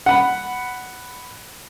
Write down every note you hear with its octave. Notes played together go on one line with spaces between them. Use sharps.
F#5 B5